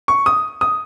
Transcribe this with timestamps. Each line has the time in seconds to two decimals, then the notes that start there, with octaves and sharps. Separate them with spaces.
0.08 C#6
0.26 D#6
0.61 D#6